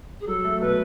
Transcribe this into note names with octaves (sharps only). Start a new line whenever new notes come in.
G#4
F#3 A4
A3
B2 B4